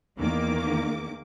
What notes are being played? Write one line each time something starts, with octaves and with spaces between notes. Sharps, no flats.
E2 D#3 A#3 D6